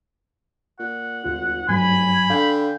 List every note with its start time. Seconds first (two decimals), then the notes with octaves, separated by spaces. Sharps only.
0.79 A#2 F#5
1.24 G#1 D2 F4
1.69 F1 G2 F#3 G#5 B5
2.30 D3 F5 G5 G#5